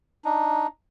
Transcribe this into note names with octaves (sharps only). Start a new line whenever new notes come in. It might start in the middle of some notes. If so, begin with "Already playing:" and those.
D4 D#4